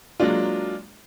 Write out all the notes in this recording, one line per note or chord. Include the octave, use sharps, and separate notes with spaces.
F#3 G#3 A#3 D4 F4